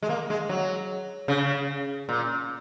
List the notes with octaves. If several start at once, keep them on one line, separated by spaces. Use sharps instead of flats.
G#3
A#3
G#3
F#3
C#3
A#2